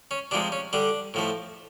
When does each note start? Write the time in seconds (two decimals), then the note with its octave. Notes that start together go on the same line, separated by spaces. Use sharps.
0.11 C#4
0.31 C3 F3 G#3 D4
0.52 C#4
0.73 D3 G3 D4
1.14 A2 F3 A3